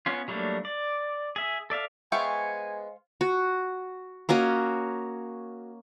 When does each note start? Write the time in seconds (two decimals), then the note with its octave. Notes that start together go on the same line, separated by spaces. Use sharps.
0.06 B3 C#4 F4
0.28 F#3 G3 A3 A#3 D4
0.65 D5
1.36 G#4 E5
1.70 A4 D5 E5 F5
2.12 G#3 B3 C5 E5 F5 G5 G#5 C#6
3.21 F#4
4.29 A#3 C#4 F#4 D#5